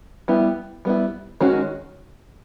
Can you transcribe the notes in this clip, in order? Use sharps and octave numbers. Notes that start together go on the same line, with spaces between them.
G3 B3 E4 G4
G3 B3 E4
D#3 G#3 C#4 F#4